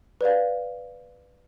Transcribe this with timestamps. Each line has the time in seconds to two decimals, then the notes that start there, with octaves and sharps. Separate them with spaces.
0.21 B4 D5 F5